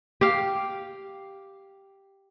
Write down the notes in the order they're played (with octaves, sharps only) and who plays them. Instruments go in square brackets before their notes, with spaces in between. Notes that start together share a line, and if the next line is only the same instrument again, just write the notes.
[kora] G4 F5